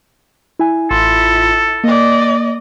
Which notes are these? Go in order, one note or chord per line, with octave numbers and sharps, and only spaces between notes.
E4 G#5
A1 E4 F4 A4 C6
A#3 D5 D#5